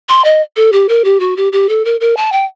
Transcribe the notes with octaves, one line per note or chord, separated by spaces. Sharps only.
C6
D#5
A4
G4
A#4
G4
F#4
G4
G4
A4
A#4
A#4
A5
G5